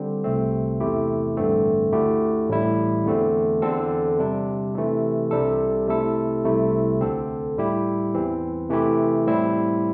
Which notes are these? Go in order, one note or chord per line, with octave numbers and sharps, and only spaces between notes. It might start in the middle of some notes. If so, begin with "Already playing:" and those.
Already playing: D3 G3 C4
C2 C3 A3 C4
E2 C3 A3 E4 G4
A1 G2 D3 A3 C4
D2 D3 A3 E4 G4
A1 A2 G3 E4
E2 D3 A3 C4
E2 D3 C4 A4
C3 G3 D4
C3 E3 A3
C2 C3 G3 D4 A4
C3 A3 E4 A4
C2 C3 A3 E4
D2 D3 C4 A4
A2 G3 E4 G4
E2 E3 C4
C3 E3 A3 E4 G4
A2 G3 C4 E4